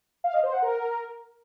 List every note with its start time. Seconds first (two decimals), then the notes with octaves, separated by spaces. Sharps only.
0.24 F5
0.34 D#5
0.43 C5
0.53 F#5
0.62 A#4